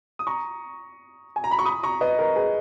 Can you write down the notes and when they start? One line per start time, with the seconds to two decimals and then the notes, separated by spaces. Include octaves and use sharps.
0.19 D#6
0.27 A#5 C#6
1.36 G#5
1.44 A#5
1.51 B5
1.59 C#6
1.65 B5 D#6
1.83 A#5 C#6
2.01 B4 D#5
2.19 A#4
2.35 G#4 B4